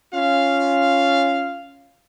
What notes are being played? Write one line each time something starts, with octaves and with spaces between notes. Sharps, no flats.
C#4 F4 F5